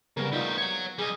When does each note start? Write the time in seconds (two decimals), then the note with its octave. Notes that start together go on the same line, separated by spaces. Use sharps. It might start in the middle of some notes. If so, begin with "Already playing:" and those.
0.17 C#3 G3 B3 A#4
0.33 A3 D#4 F4 G4
0.58 C#5 F#5
0.99 G3 G#4 D#5